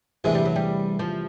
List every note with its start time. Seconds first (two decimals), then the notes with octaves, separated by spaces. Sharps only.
0.24 E2 C3 E3 G#3 A3 D4
0.35 G3
0.45 F#3
0.56 G3
0.99 F3